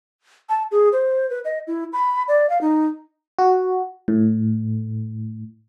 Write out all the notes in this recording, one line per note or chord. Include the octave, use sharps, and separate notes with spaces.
A5
G#4
C5
B4
D#5
E4
B5
D5
F5
D#4
F#4
A2